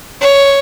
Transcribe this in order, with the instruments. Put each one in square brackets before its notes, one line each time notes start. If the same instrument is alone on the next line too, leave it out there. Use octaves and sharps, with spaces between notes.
[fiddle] C#5